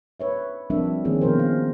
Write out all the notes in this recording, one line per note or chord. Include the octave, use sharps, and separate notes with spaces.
B4 C#5 E5
F3 G3 C4 D4 A#4 E5
D#3 F3 A#3 C4 C#4 G#4
B2 F3 A#4 C5
F5